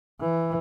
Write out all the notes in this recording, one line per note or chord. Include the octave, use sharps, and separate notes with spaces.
E3